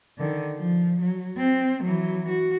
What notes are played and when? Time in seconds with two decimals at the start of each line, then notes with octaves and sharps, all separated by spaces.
0.18 D3 D#3
0.55 F3
1.01 F#3
1.37 C4
1.83 E3 F#3
2.28 F#4